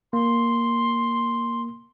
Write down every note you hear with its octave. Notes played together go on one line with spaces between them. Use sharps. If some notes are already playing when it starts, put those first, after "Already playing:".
A#3 C6